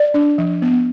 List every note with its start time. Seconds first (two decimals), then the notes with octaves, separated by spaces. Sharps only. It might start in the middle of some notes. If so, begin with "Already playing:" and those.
Already playing: D5
0.14 D4
0.38 F3
0.62 B3